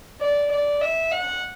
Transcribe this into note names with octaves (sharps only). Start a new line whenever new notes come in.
D5
D5
E5
F#5